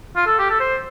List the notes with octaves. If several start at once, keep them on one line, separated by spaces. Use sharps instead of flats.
F4
A4
G4
A4
C5